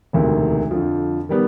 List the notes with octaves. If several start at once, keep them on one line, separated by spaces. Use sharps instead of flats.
E1 D2 C3 D#3
F2 D3 F3
D#3 G3 B3